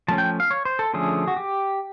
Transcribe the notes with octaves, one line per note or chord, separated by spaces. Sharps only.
F3 A3 C#4 A5
G5
F5
C#5
C5
A4
D3 F3 A3 C#4 G#4
F#4
G4